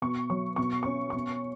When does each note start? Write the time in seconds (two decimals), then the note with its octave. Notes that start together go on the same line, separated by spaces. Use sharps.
0.02 B2 C#6
0.30 F#3 C#6
0.56 B2 C#6
0.83 C#4 C#6
1.10 B2 C#6